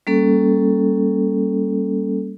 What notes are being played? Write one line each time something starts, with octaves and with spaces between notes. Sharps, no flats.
G3 A#3 C#4 A4